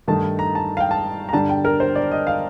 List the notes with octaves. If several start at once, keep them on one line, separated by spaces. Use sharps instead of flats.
G2 D#3 A3 D#4 A5
A#5
A5
F5
G5
A5
A#5
G2 D3 G3 A5
G5
A#4
C5
D5
D#5
F5